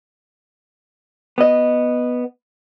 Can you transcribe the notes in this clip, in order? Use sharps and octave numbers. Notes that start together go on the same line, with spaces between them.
B3 D#5